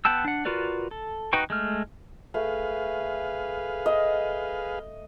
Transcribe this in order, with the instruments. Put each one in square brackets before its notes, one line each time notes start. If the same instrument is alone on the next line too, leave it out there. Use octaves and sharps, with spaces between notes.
[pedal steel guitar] B3 F#5 G5 A5 E6
D4 F#5
F4 F#4 A#4 B4 D5
A4
D#4 F#4 B4 G5 C#6
G#3 A3 F6
[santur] A3 [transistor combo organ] G#4 B4 F5
[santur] D#5